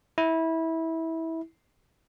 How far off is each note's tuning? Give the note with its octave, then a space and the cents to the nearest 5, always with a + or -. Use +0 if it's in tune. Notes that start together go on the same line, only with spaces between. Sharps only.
E4 -20